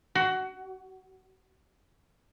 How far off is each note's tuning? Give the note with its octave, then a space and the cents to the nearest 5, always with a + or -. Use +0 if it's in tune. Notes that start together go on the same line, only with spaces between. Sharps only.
F#4 +20